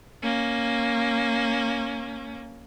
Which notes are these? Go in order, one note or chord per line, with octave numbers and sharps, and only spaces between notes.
A#3 C#4